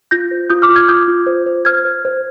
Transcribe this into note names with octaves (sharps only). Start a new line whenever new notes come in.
F4 G6 A#6
C5
F4 D#6 G6
D6 F6
F4
F6 G#6
F4 D#6 G6
F4
C5
C5
C5 F6 G#6
C5
C5